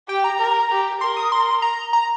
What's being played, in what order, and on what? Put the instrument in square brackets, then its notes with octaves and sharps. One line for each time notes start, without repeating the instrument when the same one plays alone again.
[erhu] G4 [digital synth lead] G5
[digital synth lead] A#5
[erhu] A#4
G4
[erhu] A#4 [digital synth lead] C6
[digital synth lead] D#6
C6
A#5
A#5